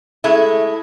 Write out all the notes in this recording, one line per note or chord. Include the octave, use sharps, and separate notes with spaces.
G#3 A3 E4